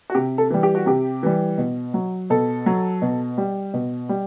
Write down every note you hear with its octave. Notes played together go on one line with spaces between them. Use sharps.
F#4
C3 G4
A4
E3 G3
G4
F#4
C3 G4
E3 G3
B2
F#3
B2 A4
F#3
B2
G3
B2
G3